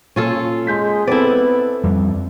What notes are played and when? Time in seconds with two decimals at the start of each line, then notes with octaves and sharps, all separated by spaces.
0.16 A#2 C#4 F4 A4
0.67 G#3 C6 G6 B6
1.07 B3 C4 E4 A4 D5
1.84 F2 G3